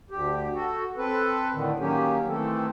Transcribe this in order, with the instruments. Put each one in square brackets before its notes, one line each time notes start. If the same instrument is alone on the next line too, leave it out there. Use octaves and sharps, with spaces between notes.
[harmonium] D2 G4
F#4 A4
C4 A4 B4
A2 D3 D#3
D#3 F#3 A#3 C#4 G4
D#3 E3 A3 C4 A4